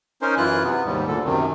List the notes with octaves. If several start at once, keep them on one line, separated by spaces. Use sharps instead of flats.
C#4 D#4 A#4 C5
F#2 E3 E4 F4 F#6
C3 B3
D#2 G#2 G3
D2 A#2 D3 A4
F#2 C3 D#3